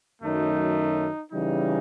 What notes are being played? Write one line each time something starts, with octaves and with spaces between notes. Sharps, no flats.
F#2 D#3 F#3 A3 D#4
C#3 E3 G3 D#4